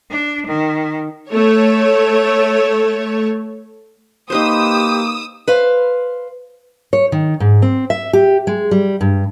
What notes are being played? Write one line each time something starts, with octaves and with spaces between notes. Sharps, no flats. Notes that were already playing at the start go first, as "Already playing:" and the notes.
D4
D#3
A3 C#5
A#3 D#4 G4 B4 C5 D#6 E6
B4 C5 F5
C#5
D#3
G#2
C4
E5
G4
G#3
G3
G2